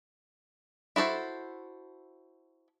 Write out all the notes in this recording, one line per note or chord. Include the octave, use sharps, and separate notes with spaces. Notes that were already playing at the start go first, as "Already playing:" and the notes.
E4 F#4 A4 C5